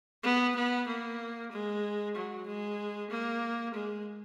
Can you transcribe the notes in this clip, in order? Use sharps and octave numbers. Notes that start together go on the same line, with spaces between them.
B3
B3
A#3
G#3
F#3
G#3
A#3
G#3